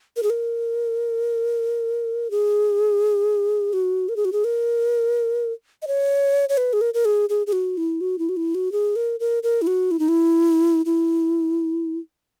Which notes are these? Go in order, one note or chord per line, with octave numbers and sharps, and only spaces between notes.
A#4
G#4
A#4
G#4
F#4
A#4
G#4
F#4
G#4
A#4
D#5
C#5
C#5
B4
G#4
A#4
A#4
G#4
G#4
G#4
F#4
E4
F#4
E4
F#4
E4
F#4
G#4
A#4
A#4
A#4
E4
F#4
E4
D#4
E4
E4